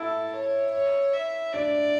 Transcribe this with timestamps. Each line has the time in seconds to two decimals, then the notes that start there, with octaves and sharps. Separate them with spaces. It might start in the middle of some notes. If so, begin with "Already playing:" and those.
Already playing: E4 A4
0.33 C#5
0.72 C#5
1.13 E5
1.53 D4 D5